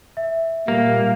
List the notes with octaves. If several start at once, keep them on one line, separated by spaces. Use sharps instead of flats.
E5
A#2 G3 A#3